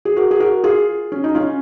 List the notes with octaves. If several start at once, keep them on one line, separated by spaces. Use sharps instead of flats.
G#4
F#4 A#4
G#4
F#4 A#4
F4 G#4
C#4
D#4
C#4 F4